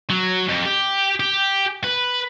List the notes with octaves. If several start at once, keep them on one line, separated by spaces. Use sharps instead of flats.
F#3
F2
G4
G4
B4